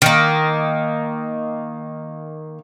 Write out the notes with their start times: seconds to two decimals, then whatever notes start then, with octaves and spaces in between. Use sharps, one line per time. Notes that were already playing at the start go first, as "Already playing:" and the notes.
0.02 D#3 A#3